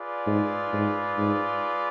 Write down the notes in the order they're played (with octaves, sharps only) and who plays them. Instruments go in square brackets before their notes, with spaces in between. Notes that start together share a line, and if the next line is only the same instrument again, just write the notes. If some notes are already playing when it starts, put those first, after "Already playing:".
Already playing: [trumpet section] F4 G#4 B4 D5
[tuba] G#2
G#2
G#2